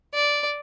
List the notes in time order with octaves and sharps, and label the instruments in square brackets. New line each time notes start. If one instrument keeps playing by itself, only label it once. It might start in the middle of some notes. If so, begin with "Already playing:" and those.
[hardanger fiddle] D5